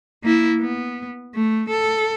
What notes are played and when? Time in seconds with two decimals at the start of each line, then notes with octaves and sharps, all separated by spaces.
0.23 A#3 E4
0.60 B3
1.34 A3
1.69 A4